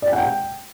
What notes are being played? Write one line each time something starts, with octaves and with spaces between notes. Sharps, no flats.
D5
G5
F#5
G5